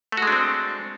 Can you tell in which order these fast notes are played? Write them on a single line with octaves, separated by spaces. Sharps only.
A3 F#4 G#3 D4 C4